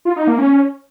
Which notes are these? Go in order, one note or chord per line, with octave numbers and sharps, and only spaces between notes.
F4
D#4
A#3
C#4